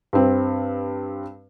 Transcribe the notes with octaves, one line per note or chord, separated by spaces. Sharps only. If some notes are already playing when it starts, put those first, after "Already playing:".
G2 C4